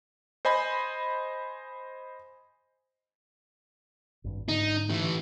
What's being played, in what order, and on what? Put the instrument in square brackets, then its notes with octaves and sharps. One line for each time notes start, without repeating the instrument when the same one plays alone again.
[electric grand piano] C5 D#5 G#5 B5
[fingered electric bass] G#1 G2
[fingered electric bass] G#2 D3 [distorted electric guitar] D#4
[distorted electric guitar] A2 E3